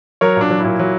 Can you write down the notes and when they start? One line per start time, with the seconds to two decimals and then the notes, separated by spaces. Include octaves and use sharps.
0.21 F#3 A#4 C#5
0.36 A#2 D4
0.50 F#3
0.60 A#2 E4
0.79 F#3